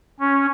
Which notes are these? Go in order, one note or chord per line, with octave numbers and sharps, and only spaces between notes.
C#4